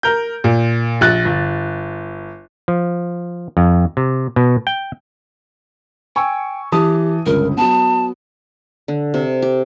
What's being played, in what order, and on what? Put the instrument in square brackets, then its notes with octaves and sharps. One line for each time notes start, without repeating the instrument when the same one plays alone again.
[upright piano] A#4 G6
A#2
A#1 F#6 A6
G1
[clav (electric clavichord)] F3
F2
C3
B2
G5
[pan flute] G5 [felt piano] G#5 C#6 E6
[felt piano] E3 A5 D#6 [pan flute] G4
[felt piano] G1 C#2 [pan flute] A#4
[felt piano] F#3 B3 [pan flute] A5
[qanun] D3
C3
G4